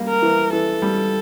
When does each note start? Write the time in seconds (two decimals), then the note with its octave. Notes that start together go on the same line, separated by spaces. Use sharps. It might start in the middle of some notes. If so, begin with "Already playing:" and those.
Already playing: G3 A#3
0.08 A#4
0.23 E3
0.53 E3 A4
0.82 G3